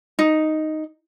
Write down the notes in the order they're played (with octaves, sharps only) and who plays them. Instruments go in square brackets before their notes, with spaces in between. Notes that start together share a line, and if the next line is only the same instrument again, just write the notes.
[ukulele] D#4